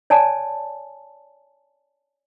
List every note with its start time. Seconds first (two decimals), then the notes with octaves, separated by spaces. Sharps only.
0.10 C#5 D5 G#5 A5